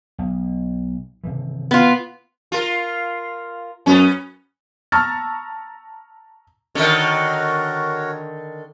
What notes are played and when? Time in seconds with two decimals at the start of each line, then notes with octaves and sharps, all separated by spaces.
0.18 B1
1.24 C3 D#3 E3
1.71 B3 F4
2.52 F4 A#4
3.86 F#2 B3 C#4
4.92 A5 A#5 C#6 E6 F6 A6
6.75 D3 D#3 F#4 A#4 C#5